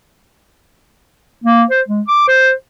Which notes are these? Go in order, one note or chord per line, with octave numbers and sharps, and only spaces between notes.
A#3
C5
G#3
D6
C5